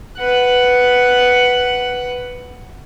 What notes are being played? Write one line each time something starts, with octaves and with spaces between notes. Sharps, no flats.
B4 F#5